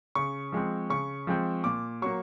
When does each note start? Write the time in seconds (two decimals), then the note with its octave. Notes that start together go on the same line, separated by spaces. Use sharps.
0.15 C#3 C#6
0.52 F3 G#3 C4
0.90 C#3 C#6
1.27 F3 G#3 C4
1.64 A#2 D6
2.02 F#3 A#3 C#6